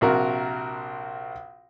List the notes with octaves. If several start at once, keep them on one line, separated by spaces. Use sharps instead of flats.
A#1 C3 F#4 A#4